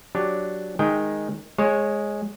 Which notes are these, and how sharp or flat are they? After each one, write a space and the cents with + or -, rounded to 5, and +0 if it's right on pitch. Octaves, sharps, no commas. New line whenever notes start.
F#3 +0 D4 +0 G4 +0
D#3 +0 G#3 +0 G5 +15
G#3 +0 C#5 -20